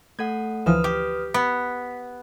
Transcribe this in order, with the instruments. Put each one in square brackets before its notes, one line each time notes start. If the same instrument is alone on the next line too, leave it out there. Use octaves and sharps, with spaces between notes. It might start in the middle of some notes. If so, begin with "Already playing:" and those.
[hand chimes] A3 A4 F#5 [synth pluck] G#6
[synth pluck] D2 E3 F3 [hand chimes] B4 D#6 F6
[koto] G4
[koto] B3 [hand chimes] B6